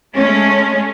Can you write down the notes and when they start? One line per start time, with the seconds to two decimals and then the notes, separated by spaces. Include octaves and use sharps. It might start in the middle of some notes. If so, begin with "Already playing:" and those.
0.14 G#3 A3 C#4